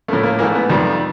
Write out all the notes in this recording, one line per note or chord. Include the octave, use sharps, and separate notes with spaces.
A2 F3 A3 A#3
A#3
G#2 E3 A3 A#3
B3
F2 C3 D#3 G3